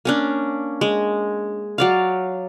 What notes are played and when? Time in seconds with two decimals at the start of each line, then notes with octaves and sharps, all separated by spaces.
0.05 A#3 C#4 D4
0.81 G#3
1.78 F#3 D5 F5